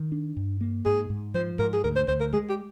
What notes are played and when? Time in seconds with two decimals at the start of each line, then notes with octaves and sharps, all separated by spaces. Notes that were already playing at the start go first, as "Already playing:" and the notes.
Already playing: D#3
0.12 D4
0.37 G2
0.61 A#3
0.85 G#2 G#4
1.10 G#2
1.34 F3 C5
1.59 G#2 A#4
1.73 G#4
1.84 D2 A#4
1.96 C5
2.08 D2 C5
2.20 A#4
2.33 G#3 G#4
2.49 G4